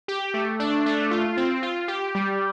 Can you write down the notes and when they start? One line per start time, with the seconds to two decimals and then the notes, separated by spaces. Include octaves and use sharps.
0.08 G4
0.34 A3
0.60 D4
0.86 A3
1.11 F4
1.37 C4
1.63 F4
1.88 G4
2.15 G3